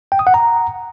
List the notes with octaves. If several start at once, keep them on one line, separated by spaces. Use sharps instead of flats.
G5
D#6
F#5
A#5